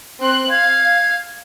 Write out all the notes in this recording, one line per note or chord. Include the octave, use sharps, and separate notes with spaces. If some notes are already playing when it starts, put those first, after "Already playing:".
C4 C6 F#6
F5 G#6